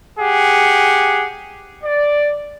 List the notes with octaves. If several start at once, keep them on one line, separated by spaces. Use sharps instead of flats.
G4 G#4 F#5
D5